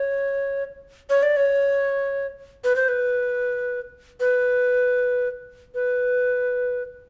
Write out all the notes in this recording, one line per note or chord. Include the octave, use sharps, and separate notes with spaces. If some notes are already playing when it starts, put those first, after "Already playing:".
Already playing: C#5
C#5
D5
C#5
B4
C5
B4
B4
B4